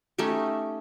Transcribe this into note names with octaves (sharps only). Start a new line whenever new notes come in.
A3 C#4 D#4 G4